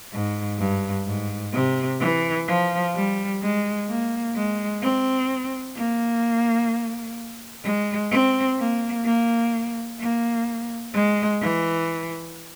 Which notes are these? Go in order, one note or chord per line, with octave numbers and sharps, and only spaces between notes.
G#2
G2
G#2
C3
E3
F3
G3
G#3
A#3
G#3
C4
A#3
G#3
C4
A#3
A#3
A#3
G#3
E3